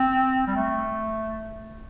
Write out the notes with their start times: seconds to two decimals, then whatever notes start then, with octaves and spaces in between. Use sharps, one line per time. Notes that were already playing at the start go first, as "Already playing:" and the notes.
Already playing: C4
0.47 G3
0.56 A3